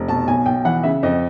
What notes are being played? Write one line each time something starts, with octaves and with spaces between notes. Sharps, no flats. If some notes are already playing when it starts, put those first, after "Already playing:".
Already playing: F1
B2 A5
B1 G#5
B1 G5
E3 F#5
C#3 E5
F2 D#5